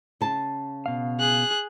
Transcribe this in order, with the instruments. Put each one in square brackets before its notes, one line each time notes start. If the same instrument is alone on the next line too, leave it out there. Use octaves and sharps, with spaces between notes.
[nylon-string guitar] C#3 A5
[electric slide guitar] B2 F5
[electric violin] G#4 F#6